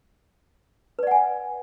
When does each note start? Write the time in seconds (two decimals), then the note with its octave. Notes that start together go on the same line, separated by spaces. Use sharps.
0.99 B4
1.03 D5
1.07 F#5
1.11 G#5